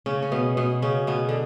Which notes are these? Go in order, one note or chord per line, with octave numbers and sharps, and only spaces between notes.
C#3 C#4
C#4
B2 B3
B2 B3
C#3 C#4
B2 B3
D3